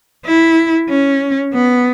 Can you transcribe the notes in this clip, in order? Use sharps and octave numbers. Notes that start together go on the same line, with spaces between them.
E4
C#4
B3